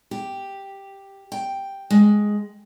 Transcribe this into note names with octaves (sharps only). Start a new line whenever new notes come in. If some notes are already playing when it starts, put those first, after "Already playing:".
G4
G5
G#3